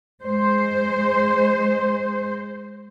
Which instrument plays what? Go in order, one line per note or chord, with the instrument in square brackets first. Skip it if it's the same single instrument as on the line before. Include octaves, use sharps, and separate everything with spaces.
[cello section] G#3 C5